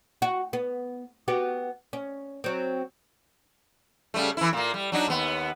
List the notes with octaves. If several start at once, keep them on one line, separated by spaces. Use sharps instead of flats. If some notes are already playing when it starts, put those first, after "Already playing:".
F#4
B3
B3 F#4 G4
C#4
F#3 C4
C#3 G3 A3
E3 E4
A#2 A#3
G3
F#3 D4 D#4
D#2 B3